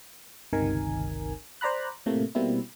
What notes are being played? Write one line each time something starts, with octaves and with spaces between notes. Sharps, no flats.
G1 C#2 C3 D#3 A#4 G#5
C5 D5 A#5 B5 F#6
A2 C3 A3 A#3
B2 G3 A#3 C4 E4